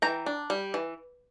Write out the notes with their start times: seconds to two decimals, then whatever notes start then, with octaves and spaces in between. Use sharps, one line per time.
0.02 E3 G5 A#5
0.26 D4
0.50 G3
0.74 E3